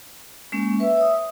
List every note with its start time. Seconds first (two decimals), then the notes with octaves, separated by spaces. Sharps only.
0.52 G#3 A#3 C#4
0.80 B4 E5
0.97 C#5 D#6